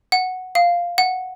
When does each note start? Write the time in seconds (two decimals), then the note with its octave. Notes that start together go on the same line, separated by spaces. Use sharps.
0.12 F#5
0.55 F5
0.98 F#5